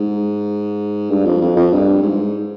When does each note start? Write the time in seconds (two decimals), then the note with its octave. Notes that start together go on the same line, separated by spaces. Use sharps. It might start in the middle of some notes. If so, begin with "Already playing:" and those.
Already playing: G#2
1.10 G2
1.25 F2
1.41 F2
1.56 F2
1.72 G2
2.03 G#2